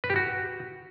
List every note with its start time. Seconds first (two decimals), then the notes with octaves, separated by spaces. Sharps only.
0.04 B4
0.10 G4
0.16 F#4